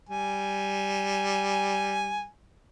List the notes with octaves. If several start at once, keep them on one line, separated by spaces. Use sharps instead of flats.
G3 G#5